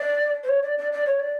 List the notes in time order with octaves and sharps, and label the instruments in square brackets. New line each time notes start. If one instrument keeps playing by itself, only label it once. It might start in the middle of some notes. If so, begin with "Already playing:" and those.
Already playing: [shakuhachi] D5
C5
C#5
D5
D5
D5
C#5
D5